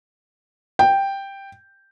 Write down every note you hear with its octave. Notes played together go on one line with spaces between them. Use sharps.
G5